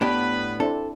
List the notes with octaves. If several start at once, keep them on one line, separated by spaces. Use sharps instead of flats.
A2 B3 D4 G4 B4 B5
C4 D4 E4 A4